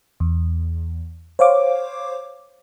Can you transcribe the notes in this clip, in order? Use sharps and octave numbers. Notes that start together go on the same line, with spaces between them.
E2
C5 C#5 F5 D6